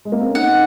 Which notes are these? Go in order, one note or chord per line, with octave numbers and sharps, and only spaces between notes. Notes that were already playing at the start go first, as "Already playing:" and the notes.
G#3
A#3
C4
C#4
D#4 F#5
D#4